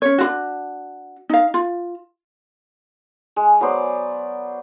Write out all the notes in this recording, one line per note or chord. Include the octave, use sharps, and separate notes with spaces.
C#4 C#5
D4 F4 F#4
D#4 F5
F4
G#3
F#3 B3 C5 D5